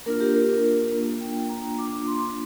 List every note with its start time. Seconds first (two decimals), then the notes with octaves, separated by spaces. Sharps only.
0.06 A#3 D4 F4 A#4
0.20 G4
0.34 A#4
0.92 A#3 D4 F4
1.20 G5
1.49 A#5
1.78 A#3 D4 F4 D6
2.07 C6